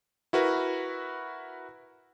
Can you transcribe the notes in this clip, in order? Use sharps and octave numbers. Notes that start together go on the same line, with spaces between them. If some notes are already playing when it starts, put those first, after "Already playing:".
E4 F#4 A#4 B4